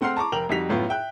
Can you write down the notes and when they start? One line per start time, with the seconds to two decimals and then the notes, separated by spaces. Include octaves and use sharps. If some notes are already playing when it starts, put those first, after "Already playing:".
0.01 A3 C4 F#5 C6 F6 C7
0.17 A5 A#5 C#6 D6
0.32 F1 A#4 G5 F7 F#7
0.49 F2 G3 D#4 F#4 B6 F7
0.69 F#2 A2 B3 F4
0.89 E5 G5 F#6